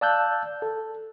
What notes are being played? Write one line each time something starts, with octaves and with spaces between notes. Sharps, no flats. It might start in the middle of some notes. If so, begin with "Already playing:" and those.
D5 F5 A5 E6 F#6 G6
A4